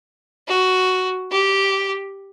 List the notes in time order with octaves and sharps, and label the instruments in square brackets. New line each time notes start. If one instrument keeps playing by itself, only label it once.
[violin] F#4
G4